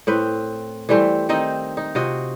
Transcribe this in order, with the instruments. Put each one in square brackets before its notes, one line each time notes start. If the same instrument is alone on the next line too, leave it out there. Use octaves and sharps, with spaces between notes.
[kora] A2 C4 B4
E3 G3 A3 C4
D#3 C4 D#4 D#5
D#4
C3 F4 F#4 D#5